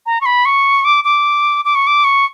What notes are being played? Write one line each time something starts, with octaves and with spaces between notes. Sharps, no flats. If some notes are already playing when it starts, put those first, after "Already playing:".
A#5
C#6
B5
C#6
D6
D6
D6
C#6
D6
C#6